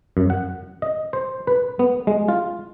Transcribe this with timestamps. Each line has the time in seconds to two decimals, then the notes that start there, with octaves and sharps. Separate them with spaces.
0.17 F#2
0.30 F#5
0.82 D#5
1.13 C5
1.47 B4
1.79 B3
2.07 G#3
2.28 F4